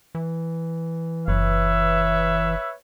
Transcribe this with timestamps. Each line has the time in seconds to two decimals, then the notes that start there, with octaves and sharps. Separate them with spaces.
0.15 E3
1.28 F#1 B4 C#5 E5